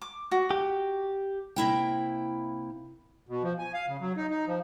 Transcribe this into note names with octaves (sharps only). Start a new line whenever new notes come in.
D6
F#4
G4
C3 A#3 E4 G5
B2
F3
G#5
F5
C#3
F#3
D#4
D#4
F3